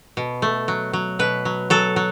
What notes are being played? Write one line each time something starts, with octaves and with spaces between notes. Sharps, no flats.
B2
A3
F#3
F#3
B2 B4
F#3
F#3 A4
F#3